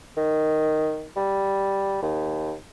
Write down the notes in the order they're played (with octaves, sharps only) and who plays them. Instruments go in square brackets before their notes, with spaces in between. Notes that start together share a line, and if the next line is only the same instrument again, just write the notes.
[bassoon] D#3
G3
D#2